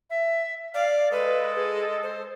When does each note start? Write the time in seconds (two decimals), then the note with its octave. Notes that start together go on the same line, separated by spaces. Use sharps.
0.10 E5
0.74 D5 F5
1.12 G#3 A4 B4 D#5
1.56 G#4
2.03 C5